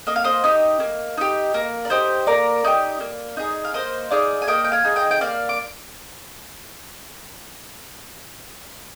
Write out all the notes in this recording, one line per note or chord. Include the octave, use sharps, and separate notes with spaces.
A#3 D#5
F5
C5 D#5
D#4 G4
A#3
D#4 G4
A#3 A#4
D5
D#4 G4 C5
A#3 A#4 D5
D#4 G4
A#3
D#4 G#4
F5
A#3 C5 D#5
D#4 G#4 D5 F5
G#5
A#3 D#5 G5
G5
F5 G#5
D#4 G#4
D#5 G5
G5
A#3 D5 F5
D6